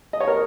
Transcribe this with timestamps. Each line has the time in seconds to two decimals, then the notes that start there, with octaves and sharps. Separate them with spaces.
0.13 D#5
0.21 C#5
0.27 A#4